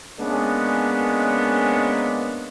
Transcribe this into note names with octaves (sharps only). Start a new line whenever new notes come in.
G#3 A#3 B3 C#4 D4